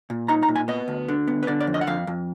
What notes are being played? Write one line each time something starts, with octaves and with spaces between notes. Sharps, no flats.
A#2
D#4 A#5
A#5
A#2
G#5
B3 D#5
D2
D3
B3
B4
D3 D5
D5
F2
D#5
F#5
F2 F5
F2